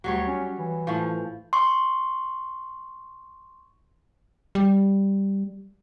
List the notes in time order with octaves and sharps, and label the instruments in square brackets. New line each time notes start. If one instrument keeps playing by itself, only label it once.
[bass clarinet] D2 [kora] F#3 G3 C#5
[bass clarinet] C#4
E3
[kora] A2 F3
[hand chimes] C6 C#6
[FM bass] G3